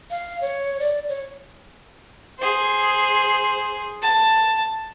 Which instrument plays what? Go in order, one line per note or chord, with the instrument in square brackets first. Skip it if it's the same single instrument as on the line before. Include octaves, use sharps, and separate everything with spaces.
[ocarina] F5
C#5
D5
C#5
[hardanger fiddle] G#4 C5
A5